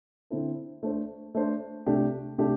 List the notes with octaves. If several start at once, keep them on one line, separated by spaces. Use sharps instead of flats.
D3 C4 E4 A4
A3 D4 C5
A3 D4 C5
C3 A3 D4 G4
C3 A3 D4 G4